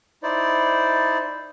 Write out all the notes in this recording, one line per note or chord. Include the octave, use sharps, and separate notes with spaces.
D#4 E4 C5 D5